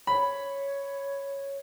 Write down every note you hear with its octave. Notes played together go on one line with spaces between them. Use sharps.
C#5 B5